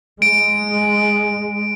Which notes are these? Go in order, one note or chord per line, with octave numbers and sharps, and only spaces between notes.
G#3 D7